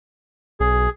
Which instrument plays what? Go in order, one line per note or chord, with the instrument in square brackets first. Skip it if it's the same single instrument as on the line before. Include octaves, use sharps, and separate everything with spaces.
[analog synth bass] B1 [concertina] G#4